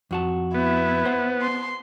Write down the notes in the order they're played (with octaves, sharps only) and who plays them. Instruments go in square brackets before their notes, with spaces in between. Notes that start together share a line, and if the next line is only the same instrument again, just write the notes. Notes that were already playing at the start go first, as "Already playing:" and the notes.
[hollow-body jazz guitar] F2 F#4 A5
[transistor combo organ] B3 [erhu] E4
[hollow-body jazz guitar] C5 F#5
[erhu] C6